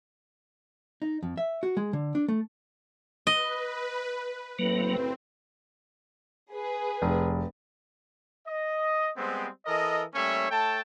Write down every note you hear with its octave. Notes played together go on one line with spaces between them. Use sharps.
D#4
F2
E5
F#4
G#3
D3
D4
A3
B4 D#5
F#1 A2 F#3 A#3 C4 B4
G#4 B4
F1
D#5
G3 G#3 B3 C4
E3 A4 A#4 D#5
G3 A3 A#3 C#4 C#5 E5
A3 A4 C#5 G5 A5